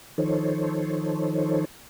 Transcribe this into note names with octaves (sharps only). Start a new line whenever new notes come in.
D#3 F3 D#4 A4 C5 C#5